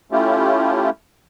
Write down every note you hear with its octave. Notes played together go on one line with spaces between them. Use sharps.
A3 C#4 E4 F4 G4